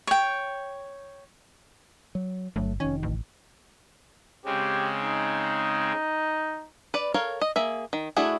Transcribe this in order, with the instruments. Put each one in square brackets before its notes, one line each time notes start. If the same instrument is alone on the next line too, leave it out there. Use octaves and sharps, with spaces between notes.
[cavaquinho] C#5 G5
[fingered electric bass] F#3
[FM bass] G1 [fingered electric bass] F#3 A3
[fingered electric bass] F1 D#3 [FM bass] C#4
[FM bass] A1
[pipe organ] C#3 G#3 C4 [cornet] G4
[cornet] D#4
[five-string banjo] B4 D5
A4 A#4 C#5 F5
D#5
A#3 G#4 E5
D#3
A3 D4 E4 F#4 G#4